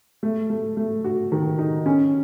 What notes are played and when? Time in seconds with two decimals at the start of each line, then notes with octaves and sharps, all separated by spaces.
0.23 A3
0.50 A3
0.77 A3
1.04 F#4
1.32 D#3
1.59 D#4
1.86 C#4